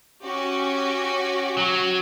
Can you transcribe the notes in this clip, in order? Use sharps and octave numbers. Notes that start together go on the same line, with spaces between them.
C#4 F#4 G4
F#3